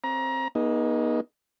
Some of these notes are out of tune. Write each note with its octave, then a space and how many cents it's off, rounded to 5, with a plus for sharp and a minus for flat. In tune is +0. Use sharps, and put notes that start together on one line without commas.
C4 +15 A#5 +25
B3 -45 D#4 +0 G#4 +0